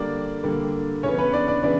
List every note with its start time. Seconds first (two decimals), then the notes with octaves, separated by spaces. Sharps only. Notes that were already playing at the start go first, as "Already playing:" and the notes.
Already playing: D3 G3 A#3 D4 D5
0.44 D3 G3 A#3
1.03 C#3 E3 B3 C#4 C#5
1.18 B3 B4
1.33 D4 D5
1.48 D4 D5
1.63 C#3 E3 B3 D4 D5